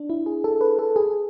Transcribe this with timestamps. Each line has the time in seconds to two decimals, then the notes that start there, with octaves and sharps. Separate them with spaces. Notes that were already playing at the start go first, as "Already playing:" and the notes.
Already playing: D4
0.10 E4
0.26 G#4
0.44 A4
0.61 B4
0.79 A4
0.96 G#4